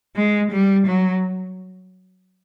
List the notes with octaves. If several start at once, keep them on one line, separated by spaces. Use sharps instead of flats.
G#3
G3
F#3